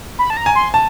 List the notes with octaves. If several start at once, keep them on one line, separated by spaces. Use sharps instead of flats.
B5
A5
A#5
G#5
C6
A5